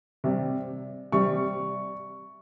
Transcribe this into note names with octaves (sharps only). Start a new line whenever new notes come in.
C3 G3
C3 G3 C#6